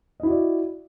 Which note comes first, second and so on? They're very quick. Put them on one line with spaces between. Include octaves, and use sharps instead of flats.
D#5 E4 F#4 D5